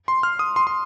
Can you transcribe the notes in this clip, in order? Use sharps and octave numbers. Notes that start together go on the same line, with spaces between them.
C6
F6
D#6
C6
C6